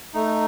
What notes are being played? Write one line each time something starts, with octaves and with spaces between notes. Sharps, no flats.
A3 D#4